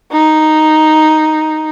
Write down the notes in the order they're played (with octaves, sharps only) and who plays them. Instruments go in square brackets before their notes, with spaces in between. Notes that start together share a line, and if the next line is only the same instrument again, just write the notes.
[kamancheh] D#4